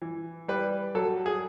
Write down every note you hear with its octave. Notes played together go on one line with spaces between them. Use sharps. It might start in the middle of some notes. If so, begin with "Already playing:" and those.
E3
G3 B4
F#3 A4
G#4